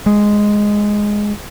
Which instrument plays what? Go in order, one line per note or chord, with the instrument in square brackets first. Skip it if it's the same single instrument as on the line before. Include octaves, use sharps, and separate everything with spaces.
[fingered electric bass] G#3